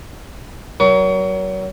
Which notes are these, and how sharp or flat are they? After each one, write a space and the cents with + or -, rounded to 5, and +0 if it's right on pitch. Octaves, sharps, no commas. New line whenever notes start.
F#3 +30 A#4 +25 C#6 +30